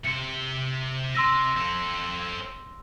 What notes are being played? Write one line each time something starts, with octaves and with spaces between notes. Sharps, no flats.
C3 C5 C#7
C3 C6 E6 A#6
C4 A4